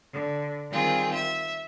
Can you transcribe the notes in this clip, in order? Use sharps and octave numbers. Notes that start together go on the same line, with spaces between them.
D3
D#3 G3 C4 F4 G#4
E5